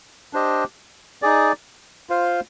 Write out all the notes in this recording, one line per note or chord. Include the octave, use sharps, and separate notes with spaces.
D4 G4 C5 D#5
D#4 G#4 D5
F4 C5 F5